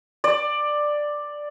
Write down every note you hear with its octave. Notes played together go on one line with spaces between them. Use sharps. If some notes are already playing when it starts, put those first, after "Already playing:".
D5